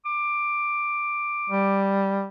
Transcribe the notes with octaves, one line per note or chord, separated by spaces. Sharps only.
D6
G3